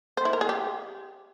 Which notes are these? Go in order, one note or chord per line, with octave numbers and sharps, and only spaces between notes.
C5
E4
A#4
G#4
G4